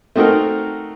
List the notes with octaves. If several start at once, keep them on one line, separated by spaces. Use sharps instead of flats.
A3 C4 D#4 F#4 A4 A#4